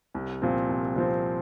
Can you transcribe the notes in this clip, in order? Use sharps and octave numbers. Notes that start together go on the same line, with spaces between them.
C2
A#2 F3 C4
C2
A#2 F3 C4